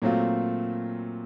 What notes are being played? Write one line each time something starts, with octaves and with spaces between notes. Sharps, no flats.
A#2 F#3 A3 C4 F4